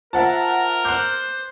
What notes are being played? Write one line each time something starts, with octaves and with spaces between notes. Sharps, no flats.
F4 A#4 C5 E5 F#5 A5 A6
C5 D6 F#6 G6